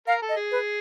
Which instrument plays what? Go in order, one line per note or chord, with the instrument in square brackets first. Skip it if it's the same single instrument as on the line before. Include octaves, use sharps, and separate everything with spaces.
[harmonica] A#4 [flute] F5
[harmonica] A4
[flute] D#5
[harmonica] G#4
[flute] B4